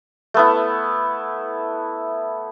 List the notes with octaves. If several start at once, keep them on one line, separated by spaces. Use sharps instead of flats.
A3 B3 E4